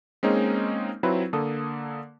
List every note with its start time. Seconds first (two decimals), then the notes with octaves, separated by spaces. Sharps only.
0.23 G#3 A#3 C4 C#4 D#4 G#4
1.03 F#3 C4 E4 F4 B4
1.33 D3 A#3 A4 D#6